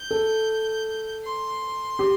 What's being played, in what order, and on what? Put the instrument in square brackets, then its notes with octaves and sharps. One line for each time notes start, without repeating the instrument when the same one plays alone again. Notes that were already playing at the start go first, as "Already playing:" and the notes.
Already playing: [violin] G6
[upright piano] A4
[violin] C6
[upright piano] G4